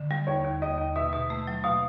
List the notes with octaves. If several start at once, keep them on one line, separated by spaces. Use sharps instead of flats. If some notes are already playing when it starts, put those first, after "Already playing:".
Already playing: D3
G3
D#2 C#5
D#2
D#2 D#5
D#2
B2 E5
B2
A3
F#3
B2 F5